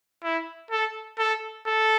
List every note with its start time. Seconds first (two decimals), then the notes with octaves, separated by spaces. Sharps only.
0.24 E4
0.71 A4
1.19 A4
1.66 A4